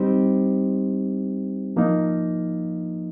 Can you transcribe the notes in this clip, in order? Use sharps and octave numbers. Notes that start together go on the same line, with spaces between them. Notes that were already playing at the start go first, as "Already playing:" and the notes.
Already playing: G3 C4 D#4 G4 C5
F3 A#3 D#4